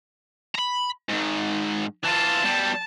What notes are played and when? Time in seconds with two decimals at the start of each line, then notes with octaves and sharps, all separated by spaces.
0.55 A#5 B5
1.09 G#2 D#3
2.04 E3 F4 A5
2.44 B2 G3